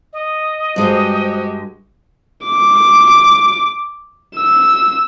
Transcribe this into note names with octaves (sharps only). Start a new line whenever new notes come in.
D#5
G2 G#3 F#4 G4 C5
D6
E6